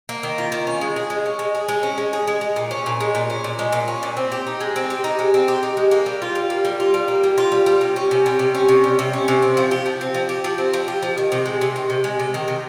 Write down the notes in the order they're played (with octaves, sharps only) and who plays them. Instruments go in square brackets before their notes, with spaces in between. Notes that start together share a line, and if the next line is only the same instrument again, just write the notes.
[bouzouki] A#3
D#3
F4
D#3
C#4
G#3
G#4
G#3
C#4
G#3
G#4
G#3
C#4
G#3
G#4
G#3
G#3
A#2
C#4
A#2
G#3
A#2
C#4
A#2
G#3
A#2
C#4
A#2
C4
G4
D#4
G#3
C4
G4
D#4
G#3
C4
G4
D#4
G#3
A#3
G3
F4
G3
A#3
G3
F4
G3
A#3
G3
F4
G3
G3
C3
C#4
C3
G3
C3
C#4
C3
G3
C3
C#4
C3
C4
F3
G4
F3
C4
F3
G4
F3
C4
F3
G4
F3
D#3
C3
G#3
C3
D#3
C3
G#3
C3
D#3
C3